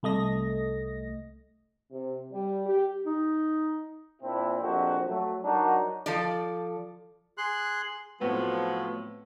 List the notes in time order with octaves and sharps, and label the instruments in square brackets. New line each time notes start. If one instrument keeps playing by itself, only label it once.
[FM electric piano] C2 A3 D#5 A#6
[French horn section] C3
G3
G4
[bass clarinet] D#4
[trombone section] A#2 C4 D4 E4
A#1 F2 C3 F#4 C5
F#3 A3
F#3 D4 D#4 F#4 A#4
[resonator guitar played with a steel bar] F3 A4 D5
[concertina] G#4 C6 F#6
[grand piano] A2 C4 [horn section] F3 F#3 B3